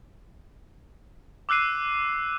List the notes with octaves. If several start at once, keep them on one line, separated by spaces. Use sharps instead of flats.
D6 E6 F#6 C7 D#7